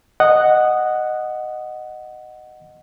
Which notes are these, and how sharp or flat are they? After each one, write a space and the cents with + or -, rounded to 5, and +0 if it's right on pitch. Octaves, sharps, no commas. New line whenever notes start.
D#5 -10 F#5 +0